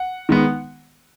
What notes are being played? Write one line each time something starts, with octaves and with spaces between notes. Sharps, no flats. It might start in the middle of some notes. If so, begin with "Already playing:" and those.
Already playing: F#5
D#3 G#3 B3